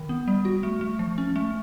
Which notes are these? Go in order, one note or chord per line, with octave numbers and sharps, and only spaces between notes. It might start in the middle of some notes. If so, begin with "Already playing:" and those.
Already playing: D#3
B3
G3
F#4
A3
A3
F3
C#4
A3